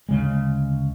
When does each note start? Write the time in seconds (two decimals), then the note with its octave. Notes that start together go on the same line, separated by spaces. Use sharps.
0.09 D2 C#3 G#3